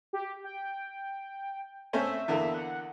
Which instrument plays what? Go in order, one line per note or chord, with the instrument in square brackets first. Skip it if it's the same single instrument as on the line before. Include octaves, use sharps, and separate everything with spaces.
[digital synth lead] G4
G5
[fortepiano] A3 C4 C#4 [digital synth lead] E5
[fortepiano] E2 D3 A#3
[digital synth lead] F#5